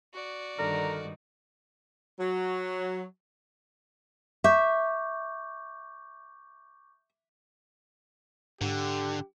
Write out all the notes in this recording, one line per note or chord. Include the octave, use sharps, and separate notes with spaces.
F#4 D5
G2 D3 D#3 D#4 A#4
F#3
E5 C#6 D6 G6
G#2 D3 G4